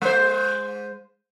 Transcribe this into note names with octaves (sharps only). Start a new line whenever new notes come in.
G#3 C5